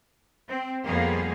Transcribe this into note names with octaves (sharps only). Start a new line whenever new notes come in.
C4
F2 G3 A#3 B3 G#4 F5